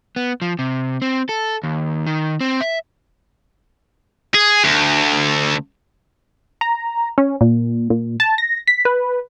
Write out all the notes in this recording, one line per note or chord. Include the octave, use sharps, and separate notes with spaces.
B3
F3
C3
C4
A4
D#2
D#3
C4
E5
G#4
D2
A#5
C#4
A#2
A#2
A5
A#6
B6
B4